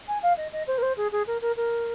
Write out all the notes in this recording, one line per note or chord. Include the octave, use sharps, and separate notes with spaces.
G#5
F5
D#5
D#5
C5
A#4
C5
G#4
G#4
A#4
A#4
A#4